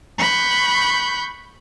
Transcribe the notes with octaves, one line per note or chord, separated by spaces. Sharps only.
B5 C#6 F#6 G6